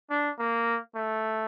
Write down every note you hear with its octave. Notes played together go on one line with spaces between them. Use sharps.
D4
A#3
A3